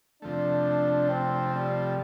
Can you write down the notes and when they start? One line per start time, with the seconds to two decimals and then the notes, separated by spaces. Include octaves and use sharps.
0.22 F2 C3 F3 A3 D4
1.09 C4
1.53 G3